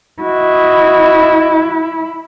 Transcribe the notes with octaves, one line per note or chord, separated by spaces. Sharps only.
E4 F#4 D#5